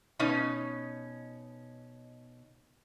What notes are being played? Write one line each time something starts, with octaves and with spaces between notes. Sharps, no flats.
B2 C#4 D#4